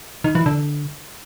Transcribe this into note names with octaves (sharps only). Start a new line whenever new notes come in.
D#3
E3
D3